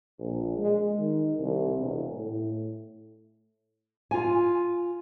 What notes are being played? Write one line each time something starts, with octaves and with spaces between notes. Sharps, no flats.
A#1
G#3
D#3
C2
E1
A2
F4 G#5